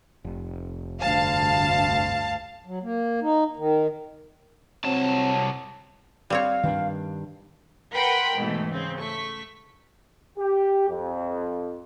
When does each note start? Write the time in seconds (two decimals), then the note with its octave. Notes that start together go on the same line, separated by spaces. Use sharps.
0.24 F1
1.01 D2 G2 F5 A5
2.66 F#3
2.83 A#3
3.22 D#4
3.56 D#3
4.85 C2 F#3 C4 A5
6.30 G3 C4 C#5 F5
6.63 G2 D#3 D4
7.93 A#4 B4 F#5 G5 B5 C6
8.36 G#2 B2 E3 A3
8.70 C#3 C4
8.99 A3 C#6 B6
10.38 G4
10.89 F2